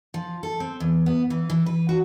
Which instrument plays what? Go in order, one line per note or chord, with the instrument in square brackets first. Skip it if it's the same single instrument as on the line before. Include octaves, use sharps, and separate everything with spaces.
[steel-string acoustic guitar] F3
A4
C4
E2
B3
E3
E3
B4
F#4